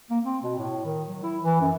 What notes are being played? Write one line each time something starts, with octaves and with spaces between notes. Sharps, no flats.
A#3
C4
B2
A2
D#3
F#3
E4
E3
F#2